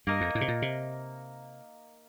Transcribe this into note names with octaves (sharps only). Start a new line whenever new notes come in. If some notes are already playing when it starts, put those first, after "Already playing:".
G2 A#3 D#4 A#4
F2
A2
C3
A#2
C3